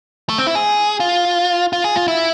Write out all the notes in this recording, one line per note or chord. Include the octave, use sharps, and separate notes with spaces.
A3
C4
E4
G#4
F4
F4
G#4
F4
E4